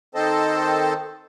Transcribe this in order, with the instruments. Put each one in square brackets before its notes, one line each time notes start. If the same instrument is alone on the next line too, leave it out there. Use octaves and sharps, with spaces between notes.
[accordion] D#3 C4 A4 C5 D#5 A5